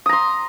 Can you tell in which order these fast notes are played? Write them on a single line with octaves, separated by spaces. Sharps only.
D#6 A#5 C6